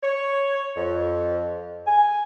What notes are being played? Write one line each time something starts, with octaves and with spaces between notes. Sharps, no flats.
C#5
F2
G#5